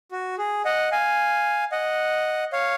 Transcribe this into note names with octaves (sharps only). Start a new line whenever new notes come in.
F#4
G#4
D#5 F#5
F5 G#5
D#5 F#5
C#5 F5